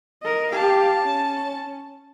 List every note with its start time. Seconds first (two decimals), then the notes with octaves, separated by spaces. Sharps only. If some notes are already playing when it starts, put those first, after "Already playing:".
0.23 A#4 D#5
0.52 G4 F5 A5
1.02 C#4